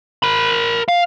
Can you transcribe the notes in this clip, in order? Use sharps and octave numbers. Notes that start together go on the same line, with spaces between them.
A#4 B5
F5